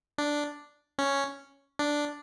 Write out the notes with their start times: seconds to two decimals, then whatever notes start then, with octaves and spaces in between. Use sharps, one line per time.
0.18 D4
0.98 C#4
1.79 D4